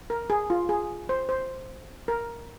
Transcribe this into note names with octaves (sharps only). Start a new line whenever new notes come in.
A#4
G#4
F4
G#4
C5
C5
A#4